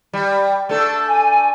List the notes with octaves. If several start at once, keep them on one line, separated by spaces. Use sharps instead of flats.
G3
A3 D4 A4
G#5